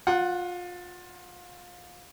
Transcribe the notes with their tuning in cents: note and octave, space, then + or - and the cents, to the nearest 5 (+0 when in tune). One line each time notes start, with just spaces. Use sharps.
F4 +25 F#5 +0